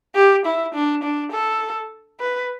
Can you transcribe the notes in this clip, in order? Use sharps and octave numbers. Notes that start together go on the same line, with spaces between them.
G4
E4
D4
D4
A4
B4